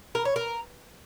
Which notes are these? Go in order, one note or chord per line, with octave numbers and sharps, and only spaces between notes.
A#4
C#5
A#4